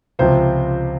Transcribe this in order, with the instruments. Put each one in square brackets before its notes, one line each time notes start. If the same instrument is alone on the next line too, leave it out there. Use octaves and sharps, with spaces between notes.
[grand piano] C#2 C3 F3 C5